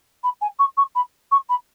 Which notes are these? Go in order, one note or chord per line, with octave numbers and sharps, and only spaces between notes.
B5
G#5
C#6
C#6
B5
C#6
B5